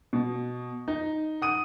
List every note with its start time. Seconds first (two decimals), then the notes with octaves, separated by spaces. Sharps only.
0.13 B2
0.88 D#4
1.42 F#5 D#6 D#7